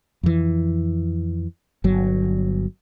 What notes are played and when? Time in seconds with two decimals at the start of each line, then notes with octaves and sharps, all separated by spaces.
0.23 F2 E3
1.84 G1 F#3